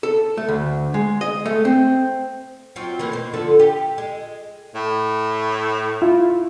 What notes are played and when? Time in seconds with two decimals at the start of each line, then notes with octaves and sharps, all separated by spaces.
0.03 A4
0.37 A3
0.48 D2
0.94 G#3
1.21 D#5
1.46 A3
1.65 C4
2.76 F#3 C4 F4
2.99 E3 A3 A#3
3.12 B2 C5
3.33 D3 F3 A4
3.59 G4
3.98 G#3
4.75 A2
6.02 E4 F4